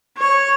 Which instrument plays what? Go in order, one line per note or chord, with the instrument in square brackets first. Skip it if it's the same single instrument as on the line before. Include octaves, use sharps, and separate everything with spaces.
[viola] C#5